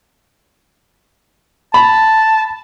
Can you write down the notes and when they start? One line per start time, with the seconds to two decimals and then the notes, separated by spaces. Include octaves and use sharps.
1.74 A5 B5